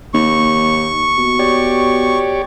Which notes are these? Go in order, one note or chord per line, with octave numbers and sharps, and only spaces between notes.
D#2 C#6
B2
G4 C#5 D5